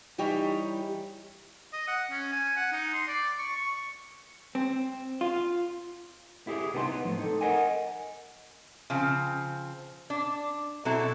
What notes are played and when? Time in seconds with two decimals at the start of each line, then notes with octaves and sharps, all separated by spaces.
0.18 E3 G3 D#4 G4 C#5
1.73 D#5
1.88 F#5
2.11 C#4
2.33 G#5
2.56 F#5
2.72 D#4
2.93 C6
3.08 D5
3.39 C#6
3.56 C#6
4.55 C4
5.21 F4
6.47 E4 G4 G#4
6.74 C2 B3 D#4 G#5 C6
6.86 B3
7.05 A2 F3
7.19 D#4 A4
7.41 A#4 D#5 F#5 G#5
8.90 C#3 F3 C4
10.10 D4
10.85 B2 F#3 C4 E4 A4